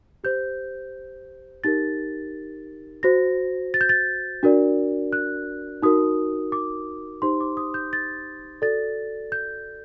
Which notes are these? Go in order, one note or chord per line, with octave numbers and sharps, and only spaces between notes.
G4 C5 G6
D#4 G4 A#4 A6
F#4 C5 A#6
A6
G6
A6
D4 F#4 A#4 D5
F#6
D#4 F#4 A#4 D#6
D6
D#4 G4 C5 C6
D6
D#6
G6
A6
F#4 A4 D5 A6
G6